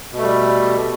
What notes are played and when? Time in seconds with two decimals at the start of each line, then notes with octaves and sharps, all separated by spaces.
0.13 B2
0.17 A3
0.22 G3